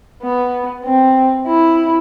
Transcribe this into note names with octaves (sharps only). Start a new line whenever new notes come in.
B3
C4
E4